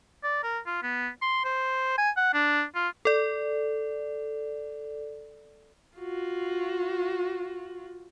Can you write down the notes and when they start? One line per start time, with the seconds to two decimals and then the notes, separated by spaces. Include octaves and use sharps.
0.23 D5
0.43 A#4
0.66 F4
0.83 B3
1.22 C6
1.45 C5
1.98 G#5
2.17 F#5
2.34 D4
2.75 F4
3.05 A4 D5
5.98 F4 F#4